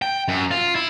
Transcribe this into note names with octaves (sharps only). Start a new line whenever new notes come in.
G5
F#2
F4
E4